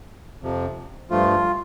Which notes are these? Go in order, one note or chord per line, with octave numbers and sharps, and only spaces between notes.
F2 C3 F3
G2 F3 A3 F4